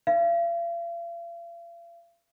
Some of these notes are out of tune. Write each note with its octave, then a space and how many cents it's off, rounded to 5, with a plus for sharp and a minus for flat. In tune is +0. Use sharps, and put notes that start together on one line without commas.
F5 -45